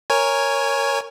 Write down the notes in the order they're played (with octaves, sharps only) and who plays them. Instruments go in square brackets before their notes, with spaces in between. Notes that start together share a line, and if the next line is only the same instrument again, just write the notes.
[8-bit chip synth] A#4 C#5 G#5